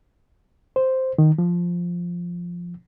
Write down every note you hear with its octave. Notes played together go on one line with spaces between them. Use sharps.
C5
D#3
F3